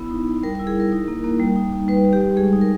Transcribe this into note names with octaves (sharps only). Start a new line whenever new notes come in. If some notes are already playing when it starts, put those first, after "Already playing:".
Already playing: B3 E4
D#4
D#4
G3 A#4
A#4
E4
G#4
E4 A#4
D#4
A#3
A#3
G3
D#4
D#4
G3 B4
G3
G4
G3
G#3 G#4
D#4
A#4